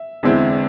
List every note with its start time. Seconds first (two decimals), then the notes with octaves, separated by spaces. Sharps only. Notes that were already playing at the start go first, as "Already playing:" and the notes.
Already playing: E5
0.23 E2 D3 G#3 C4 E4